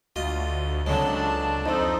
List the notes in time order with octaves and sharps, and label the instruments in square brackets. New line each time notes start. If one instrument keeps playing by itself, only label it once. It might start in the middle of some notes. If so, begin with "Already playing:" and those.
[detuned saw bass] D2 [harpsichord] F4 D#5 [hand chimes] F#4 F6 A6
[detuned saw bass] C#2 [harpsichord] F#3 G#3 [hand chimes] C4 A4 C#5 [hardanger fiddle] D4 A5
[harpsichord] F2 F3 [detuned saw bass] D#4 [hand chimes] D#5 C6 E6